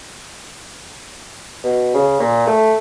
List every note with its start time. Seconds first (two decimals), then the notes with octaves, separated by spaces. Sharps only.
1.64 B2
1.94 C#3
2.20 A#2
2.47 A3